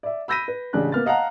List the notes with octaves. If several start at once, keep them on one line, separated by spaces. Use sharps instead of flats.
D5 E5
B5 E6 G6 A#6 B6 D#7
B4
A1 C#3 D4 F#6
A#3 B3 F6 A6
D#5 F5 F#5 A5 A#5